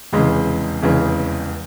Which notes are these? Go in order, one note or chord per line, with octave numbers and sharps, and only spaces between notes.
F1 E2 C#3 E3 G#3
F1 E2 C#3 E3 G#3